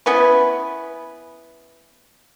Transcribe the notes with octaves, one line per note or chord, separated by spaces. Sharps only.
B3 C#4 E4 B4